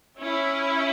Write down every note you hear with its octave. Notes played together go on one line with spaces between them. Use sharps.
C#4 E4